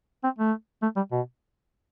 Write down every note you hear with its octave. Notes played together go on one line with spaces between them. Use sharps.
C4
A3
A3
G3
B2